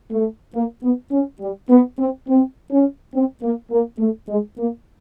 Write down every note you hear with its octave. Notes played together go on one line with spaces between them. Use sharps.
A3
A#3
B3
C#4
G3
B3
C4
C4
C#4
C4
A#3
A#3
A3
G#3
A#3